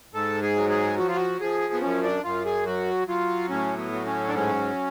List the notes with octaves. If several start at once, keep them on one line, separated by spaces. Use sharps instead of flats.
G#2 A4
G#4
F#3
G#4
F3 F#4
F4
F#4
F3 G#4
B3
F#2 C#4
D4
F#2 F4
G#4
F#3 F#4
F#3 F4
A2 C#4
B3
F#3
C#4
D4
G#2 C#4